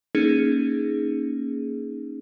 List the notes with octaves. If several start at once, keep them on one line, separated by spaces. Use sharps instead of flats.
A#3 C#4 D#4 G#4